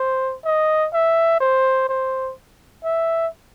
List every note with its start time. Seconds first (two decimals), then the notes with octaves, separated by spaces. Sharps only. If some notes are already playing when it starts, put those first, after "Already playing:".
Already playing: C5
0.45 D#5
0.93 E5
1.41 C5
1.89 C5
2.84 E5